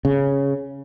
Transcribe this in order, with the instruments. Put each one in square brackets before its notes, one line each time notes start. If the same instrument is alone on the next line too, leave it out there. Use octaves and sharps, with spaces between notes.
[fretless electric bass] C#3